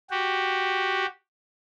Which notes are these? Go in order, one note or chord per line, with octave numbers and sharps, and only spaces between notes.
F#4 G4